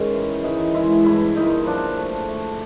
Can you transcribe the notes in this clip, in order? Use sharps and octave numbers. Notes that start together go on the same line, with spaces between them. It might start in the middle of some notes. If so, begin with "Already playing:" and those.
Already playing: G#2 D#3 G#3 C#4
E3
E3 D#4
G#3 E4
G2 E4
A#2 D#4
F3 D4
A3
A3